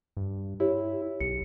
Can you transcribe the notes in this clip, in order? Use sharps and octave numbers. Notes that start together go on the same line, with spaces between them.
G2
E4 G4 C#5
B1 C#7